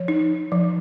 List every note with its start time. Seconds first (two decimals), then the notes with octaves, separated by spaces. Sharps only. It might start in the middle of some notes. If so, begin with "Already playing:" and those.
Already playing: F3 C#5
0.08 D#4
0.52 F3